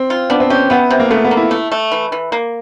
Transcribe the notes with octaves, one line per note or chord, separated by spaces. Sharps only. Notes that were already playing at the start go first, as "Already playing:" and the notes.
Already playing: C4
F4
B3 D4
C4
C#4 G4
E3 B3
C3
A#3
C#3 A3
B3
A#3
E4
A3
A3
E3
E3
A#3